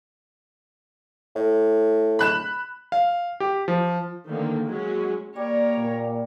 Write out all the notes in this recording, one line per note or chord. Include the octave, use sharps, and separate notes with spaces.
A2
B5 F#6 E7
F5
G4
F3
D3 D#3 F3 A#3
F#3 G#3 C#4 F#4
G3 A#3 A#4 C#5 D5
A#2